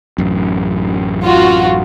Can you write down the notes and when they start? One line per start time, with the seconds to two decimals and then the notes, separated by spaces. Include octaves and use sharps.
0.18 A1 F#2
1.24 F4 F#4